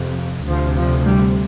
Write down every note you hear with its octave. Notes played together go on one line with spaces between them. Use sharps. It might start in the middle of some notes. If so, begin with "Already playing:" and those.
Already playing: F2 C3
D2 C3 F3
F3
G3